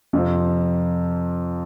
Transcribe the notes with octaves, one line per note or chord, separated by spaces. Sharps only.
F2 C3 F3